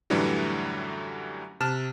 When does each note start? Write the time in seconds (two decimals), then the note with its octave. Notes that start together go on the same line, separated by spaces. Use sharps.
0.10 F#2 A2 D3 E3 F#3 G3
1.60 C3 A5 F6 E7